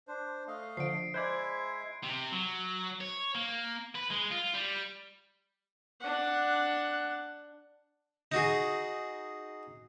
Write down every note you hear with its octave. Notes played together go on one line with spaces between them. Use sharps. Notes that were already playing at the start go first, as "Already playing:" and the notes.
D4 C5
A3 D#5 F5
D3 F3 C7 D7
G#3 E4 C5 D5 E5 F#6 G#6
C3
F#3
C#5
A#3
B4
G#3
F4
G3
D4 F#5
D#4 F#4 G#4